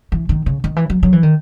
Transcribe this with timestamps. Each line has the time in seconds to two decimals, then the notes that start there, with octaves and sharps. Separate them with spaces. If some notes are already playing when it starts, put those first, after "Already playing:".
0.12 E3
0.29 D#3
0.46 C#3
0.64 D#3
0.76 E3
0.90 F#3
1.03 F#3
1.13 E3
1.23 D#3